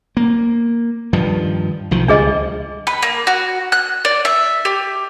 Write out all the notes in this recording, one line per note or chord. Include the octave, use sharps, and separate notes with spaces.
A#3
G2 D#3 F3
B1 D#3 F3
C#2 F3 G3 D4 G#4 D#5
B4
A#3
F#4
F#6
D5
E5
G4